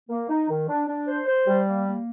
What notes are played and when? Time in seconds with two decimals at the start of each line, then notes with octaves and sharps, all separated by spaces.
0.10 A#3
0.29 D#4
0.49 D#3
0.69 D4
0.88 D4
1.07 C5
1.27 C5
1.47 G3
1.67 A#3
1.86 A#3